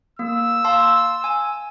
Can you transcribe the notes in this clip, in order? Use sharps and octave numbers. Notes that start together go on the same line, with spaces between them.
A#3 E6
F5 A5 C6
G#5